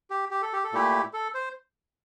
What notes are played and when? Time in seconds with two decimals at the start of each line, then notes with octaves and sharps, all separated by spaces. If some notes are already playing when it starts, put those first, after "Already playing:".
0.10 G4
0.31 G4
0.42 A4
0.53 G4
0.64 A4
0.72 A#2 A3 E4 G4
1.13 A4
1.34 C5